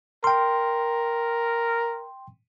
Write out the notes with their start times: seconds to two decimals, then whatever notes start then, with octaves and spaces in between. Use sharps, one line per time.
0.24 A#4 G5 C6